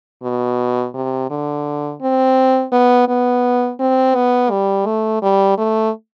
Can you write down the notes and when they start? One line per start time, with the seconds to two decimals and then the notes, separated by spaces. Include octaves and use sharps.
0.23 B2
0.94 C3
1.30 D3
2.01 C4
2.72 B3
3.08 B3
3.80 C4
4.15 B3
4.51 G3
4.86 A3
5.22 G3
5.58 A3